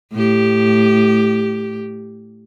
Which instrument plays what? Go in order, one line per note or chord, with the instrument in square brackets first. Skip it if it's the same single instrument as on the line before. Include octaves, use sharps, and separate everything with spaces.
[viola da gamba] A2 G4